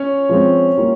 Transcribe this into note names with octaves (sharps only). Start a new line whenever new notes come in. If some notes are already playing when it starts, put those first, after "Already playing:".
Already playing: C#4 C#5
F3 G#3 C4
G3 A#3 F4